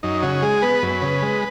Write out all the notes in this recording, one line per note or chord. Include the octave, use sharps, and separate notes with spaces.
F#2 D#4
C#3 F#4
G#3 G#4
B3 B4
F#2
C#3
G#3